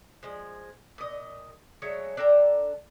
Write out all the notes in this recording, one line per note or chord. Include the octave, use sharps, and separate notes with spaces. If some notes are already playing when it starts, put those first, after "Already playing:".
F3 G#3
A#2 D#5
F#3 G#3 A3 C#5
D4 A4 G5 A#5